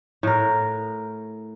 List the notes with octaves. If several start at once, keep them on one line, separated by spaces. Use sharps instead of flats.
A2 A#4